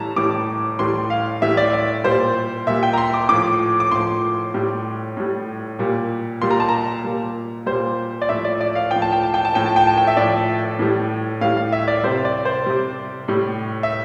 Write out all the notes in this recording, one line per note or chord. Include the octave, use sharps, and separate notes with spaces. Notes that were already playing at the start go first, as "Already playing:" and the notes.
Already playing: A2 E3 G3 A5 A#5
A2 E3 G3 D6
A2 E3 G3 C6
F5
A2 E3 G3 E5
D5
D5
A#2 G3 C5
A#2 G3 E5
G5
A#5
C6
D6
A2 F3 D6
D6
A2 F3 C6
A2 G3
A2 G3
A#2 G3
A#2 G3 C6
A#5
A5
A#5
A#2 G3
A#2 G3 C5
D5
A2 F3 E5
D5
D5
F5
A2 F3 G5
A5
G5
A5
G5
A5
A2 F3 G5
A5
G5
A5
G5
E5
A2 F3 D5
A2 E3 G3
A2 E3 G3 F5
F5
E5
D5
C3 G3 C5
D5
C5
C3 G3
A2 G3
E5